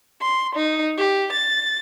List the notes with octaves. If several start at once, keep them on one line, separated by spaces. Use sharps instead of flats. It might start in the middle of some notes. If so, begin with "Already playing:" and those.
C6
D#4
G4
A6